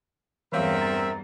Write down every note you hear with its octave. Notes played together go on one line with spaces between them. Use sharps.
E2 G2 E3 C4 A#4 C#5 E5 F5
A#5 A6